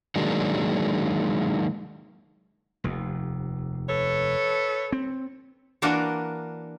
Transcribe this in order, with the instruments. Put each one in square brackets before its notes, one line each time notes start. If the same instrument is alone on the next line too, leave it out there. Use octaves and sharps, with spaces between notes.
[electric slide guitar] D#3 F#3 G#3 A#3 D4
[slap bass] F1 D#2
[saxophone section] A4 B4 C#5
[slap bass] C4
[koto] E3 A#3 D4 F#4 A#4